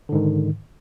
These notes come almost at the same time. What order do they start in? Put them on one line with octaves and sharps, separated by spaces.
D3 G#2 D#3